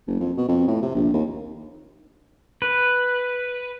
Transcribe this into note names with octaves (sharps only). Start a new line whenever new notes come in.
F#1
F2
B2
F2
A2
C3
A#1
D#2
B4